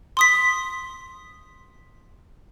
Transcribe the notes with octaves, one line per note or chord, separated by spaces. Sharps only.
C6 D#6 B6